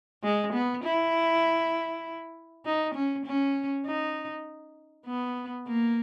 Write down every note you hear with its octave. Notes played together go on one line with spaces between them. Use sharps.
G#3
B3
E4
D#4
C#4
C#4
D#4
B3
A#3